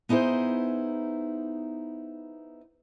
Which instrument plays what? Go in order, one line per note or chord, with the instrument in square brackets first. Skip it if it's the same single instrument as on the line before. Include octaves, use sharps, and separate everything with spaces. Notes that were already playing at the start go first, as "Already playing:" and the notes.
[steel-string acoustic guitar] B3 D#4 E4 G#4 C5